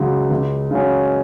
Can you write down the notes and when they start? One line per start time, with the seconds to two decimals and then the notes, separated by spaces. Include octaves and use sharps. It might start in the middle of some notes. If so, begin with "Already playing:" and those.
Already playing: C#2 C#3 F#3
0.30 C#2
0.71 C#3 F#3 C#4